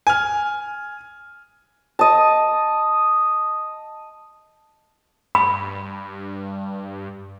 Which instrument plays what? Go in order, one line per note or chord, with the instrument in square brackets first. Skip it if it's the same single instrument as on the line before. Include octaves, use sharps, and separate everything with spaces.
[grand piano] G#5 F6
[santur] D#5 A5
[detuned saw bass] G2 [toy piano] B5